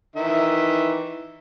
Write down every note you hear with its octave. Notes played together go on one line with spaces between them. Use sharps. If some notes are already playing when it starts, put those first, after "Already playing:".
D#3 E3 E5